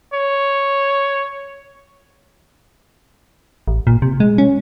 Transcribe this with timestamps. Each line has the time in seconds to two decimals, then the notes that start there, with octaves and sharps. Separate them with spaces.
0.14 C#5
3.68 A1
3.87 A#2
4.02 C3
4.20 G#3
4.38 C#4